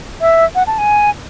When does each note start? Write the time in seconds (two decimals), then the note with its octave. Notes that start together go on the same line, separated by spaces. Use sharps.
0.21 E5
0.55 F#5
0.67 A5
0.78 G#5